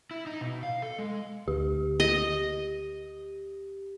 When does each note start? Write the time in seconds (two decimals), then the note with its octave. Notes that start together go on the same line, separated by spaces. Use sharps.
0.11 E4
0.27 D#4
0.41 B2
0.63 F5
0.82 A4
0.99 G#3
1.48 D2 G4
2.00 G4 D#5